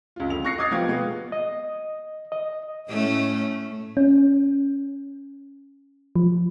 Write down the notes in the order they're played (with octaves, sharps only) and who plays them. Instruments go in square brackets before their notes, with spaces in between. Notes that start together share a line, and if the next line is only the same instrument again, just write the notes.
[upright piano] C#2 F4
F2 D3 F7
C#6 F#6 A#6 C7 C#7
D#5 D6 D#6 G#6 A6 C7
C3 F3 B3 F5 G5 G#6
B2 G#3 B3
[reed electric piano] D#5
D#5
[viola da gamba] A2 A3 C#4
[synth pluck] C#4
F3